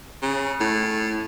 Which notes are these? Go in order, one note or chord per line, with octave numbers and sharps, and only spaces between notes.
C#3
A2